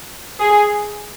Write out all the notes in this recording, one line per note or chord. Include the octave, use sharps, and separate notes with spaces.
G#4